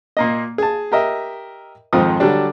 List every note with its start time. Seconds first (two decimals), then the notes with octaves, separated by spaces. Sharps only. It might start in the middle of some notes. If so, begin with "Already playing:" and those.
0.17 A#2 A#3 D#5
0.58 G#4 A5
0.92 G4 A#4 D#5 E5
1.93 F2 G#2 D#3 F3 F4 D#6
2.20 D3 F#3 G3 D4